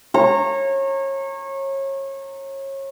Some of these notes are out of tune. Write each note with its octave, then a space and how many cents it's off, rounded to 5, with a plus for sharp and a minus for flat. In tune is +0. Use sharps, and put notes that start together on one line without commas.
C#5 -30 A#5 -20